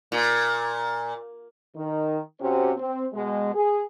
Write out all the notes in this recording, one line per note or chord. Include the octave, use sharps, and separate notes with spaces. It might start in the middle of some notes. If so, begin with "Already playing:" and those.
A#2
D#3
C3 C#4 F#4 G4 C5
C4
B2 G#3
G#4